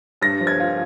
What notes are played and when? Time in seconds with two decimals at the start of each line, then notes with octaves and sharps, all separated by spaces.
0.22 G2 A#6
0.40 F3
0.47 G#6
0.60 F4